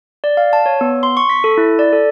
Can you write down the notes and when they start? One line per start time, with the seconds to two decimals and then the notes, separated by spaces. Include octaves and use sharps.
0.24 D5
0.37 F5
0.53 A5
0.66 C#5
0.81 B3
1.03 C6
1.17 C#6
1.30 B6
1.44 A4
1.57 E4
1.79 D5
1.93 A4